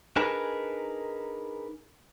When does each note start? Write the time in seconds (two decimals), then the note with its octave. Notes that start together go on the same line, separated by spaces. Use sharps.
0.16 D4 D#4 G#4 A#4 B4